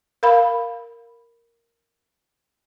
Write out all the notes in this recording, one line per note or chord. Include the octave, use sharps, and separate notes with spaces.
A#4 F5 B5